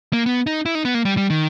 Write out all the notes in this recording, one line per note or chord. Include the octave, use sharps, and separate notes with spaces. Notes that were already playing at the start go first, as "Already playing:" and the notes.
A#3
B3
D#4
E4
D#4
B3
A#3
G3
G3
D#3